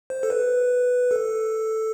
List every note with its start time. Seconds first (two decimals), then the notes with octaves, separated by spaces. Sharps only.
0.10 C5
0.23 A4
0.30 B4
1.11 A4